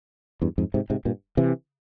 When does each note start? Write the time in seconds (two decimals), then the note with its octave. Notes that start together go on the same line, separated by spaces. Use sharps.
0.42 E2 G2
0.58 F2 G#2
0.74 G#2 C3
0.90 G#2 C3
1.05 G2 A#2
1.37 C3 E3